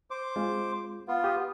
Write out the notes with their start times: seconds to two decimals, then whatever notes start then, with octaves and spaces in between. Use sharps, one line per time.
0.11 C5 D6
0.36 G#3 C4 F4
1.08 B3 F4
1.24 G4 D#6